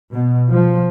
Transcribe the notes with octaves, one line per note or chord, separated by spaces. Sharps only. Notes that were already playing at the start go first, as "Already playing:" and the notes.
B2
F3